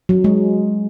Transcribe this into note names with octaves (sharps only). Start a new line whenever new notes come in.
F#3
G#3